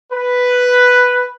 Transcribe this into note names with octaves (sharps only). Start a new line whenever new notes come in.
B4